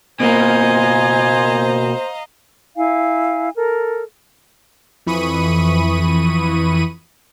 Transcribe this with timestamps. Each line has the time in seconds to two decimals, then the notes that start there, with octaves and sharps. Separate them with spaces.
0.20 B2 A#3 C5 D#5 F5 G#5 A#5
2.76 E4 F5 G#5
3.55 A4 A#4
5.06 F2 E3 B5 C#6 D#6 D#7